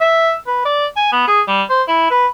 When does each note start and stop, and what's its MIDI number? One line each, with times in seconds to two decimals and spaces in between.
0.01 0.34 76
0.47 0.60 71
0.65 0.86 74
0.96 1.11 80
1.12 1.24 59
1.28 1.41 68
1.48 1.62 55
1.70 1.82 72
1.88 2.06 64
2.10 2.27 71